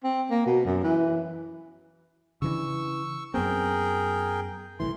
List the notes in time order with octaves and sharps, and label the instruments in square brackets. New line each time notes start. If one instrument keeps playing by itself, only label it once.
[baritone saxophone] C4
A#3
B2
F#2
E3
[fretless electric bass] C#3 E3 D4 [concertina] C#6 E6
[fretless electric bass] F#2 B3 C4 [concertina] G#4 A#4 G5
[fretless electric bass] C2 A2 E3 [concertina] C6